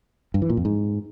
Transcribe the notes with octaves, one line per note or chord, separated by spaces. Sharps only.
G2
E3
A#2
F2
G#2